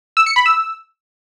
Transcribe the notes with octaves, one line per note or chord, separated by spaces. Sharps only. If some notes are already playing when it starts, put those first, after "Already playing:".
E6
C#7
B5
E6